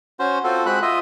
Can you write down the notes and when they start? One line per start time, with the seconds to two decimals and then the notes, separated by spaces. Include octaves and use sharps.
0.19 C#4 F#4 C5
0.44 C4 F4 F#4 A4
0.66 G#3 C4 F#4 B5 F#6
0.82 F4 D#5 E5